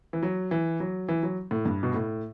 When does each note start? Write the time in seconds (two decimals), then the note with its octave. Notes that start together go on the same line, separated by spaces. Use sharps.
0.13 E3
0.23 F#3
0.51 E3
0.80 F#3
1.09 E3
1.23 F#3
1.51 A2
1.65 G2
1.83 B2
1.94 A2